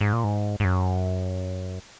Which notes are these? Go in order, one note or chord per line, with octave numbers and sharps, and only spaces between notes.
G#2
A#2
G#2
G#2
F#2